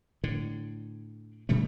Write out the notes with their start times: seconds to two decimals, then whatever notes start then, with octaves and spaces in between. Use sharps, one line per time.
0.24 A2 D3
1.49 A#2 D3 G3 A3